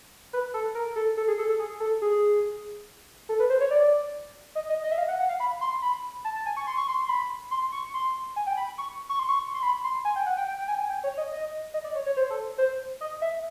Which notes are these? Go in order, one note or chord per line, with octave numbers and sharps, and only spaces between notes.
B4
A4
A#4
A4
A4
G#4
A4
A4
G#4
A4
G#4
A4
B4
C5
C#5
D5
D#5
D#5
D#5
E5
F5
F#5
F#5
F5
B5
C6
B5
A5
A5
G#5
C#6
C6
C#6
C6
C6
B5
C6
C#6
C6
G#5
G5
B5
C#6
C#6
C6
C#6
C6
B5
C6
G#5
G5
F#5
G5
G5
G5
G#5
G5
G#5
G5
C#5
D#5
D#5
D#5
D5
C#5
C#5
C5
A4
C5
D#5
E5